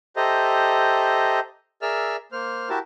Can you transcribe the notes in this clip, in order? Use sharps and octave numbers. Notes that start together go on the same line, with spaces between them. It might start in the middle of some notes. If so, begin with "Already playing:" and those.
G4 A4 C5 D#5 E5 A#5
G#4 A#4 D5 E5 E6 F6
A#3 C5 F6
E4 F#4 G4 A#4 E5 A5